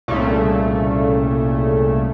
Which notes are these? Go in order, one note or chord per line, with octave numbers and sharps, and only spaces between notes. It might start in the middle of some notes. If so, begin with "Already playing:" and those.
C2 A#2 C#3 A3